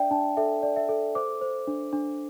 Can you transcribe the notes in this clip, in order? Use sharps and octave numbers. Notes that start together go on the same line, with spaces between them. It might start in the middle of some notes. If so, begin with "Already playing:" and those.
Already playing: D4 D5 E5 G5
D4 A5
A4 E5
D5
E5
A4
C5 D6
C5
D4
D4